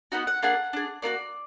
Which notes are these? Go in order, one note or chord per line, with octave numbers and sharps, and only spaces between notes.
B3 D#4 F#4 F#5
F#5
A#3 D4 G#4 F#5
D4 G#4
A#3 D4 F#4 D5